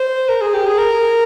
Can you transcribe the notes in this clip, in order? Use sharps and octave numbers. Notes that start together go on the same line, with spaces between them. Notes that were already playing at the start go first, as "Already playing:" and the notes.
Already playing: C5
A#4
G#4
G4
G#4
A#4